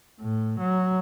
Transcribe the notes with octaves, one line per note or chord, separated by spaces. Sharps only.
A2
F#3